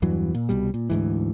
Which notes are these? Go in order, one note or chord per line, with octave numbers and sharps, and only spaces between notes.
E2 G2 E3 F#3
A#2
C2 B2 G3
A#2
D2 G#2 E3